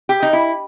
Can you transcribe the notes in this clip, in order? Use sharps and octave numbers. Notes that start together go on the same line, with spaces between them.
G4
D#4
E4